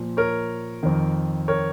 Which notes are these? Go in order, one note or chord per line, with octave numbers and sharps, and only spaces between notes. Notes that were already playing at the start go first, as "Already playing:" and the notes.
Already playing: A#2 F3
A#4 C#5
F2 D#3
A#4 C#5